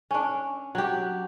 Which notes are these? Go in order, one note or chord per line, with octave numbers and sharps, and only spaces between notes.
C#4 D4
F#3 G4